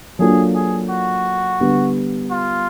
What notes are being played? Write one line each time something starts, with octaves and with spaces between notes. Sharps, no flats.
F#3 A#3 D4 F4 G#4 A4
G#4
F#4
D3 G3 B3
F4